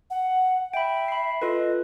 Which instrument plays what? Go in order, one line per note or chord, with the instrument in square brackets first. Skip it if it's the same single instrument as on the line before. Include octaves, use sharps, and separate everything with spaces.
[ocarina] F#5
[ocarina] E5 [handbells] G5 B5
[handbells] B5 C7
[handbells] F4 A4 B4 [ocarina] D#5